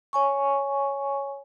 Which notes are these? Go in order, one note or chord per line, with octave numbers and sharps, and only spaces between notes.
C#5 G#5 C#6